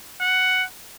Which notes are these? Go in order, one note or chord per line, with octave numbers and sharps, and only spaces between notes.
F#5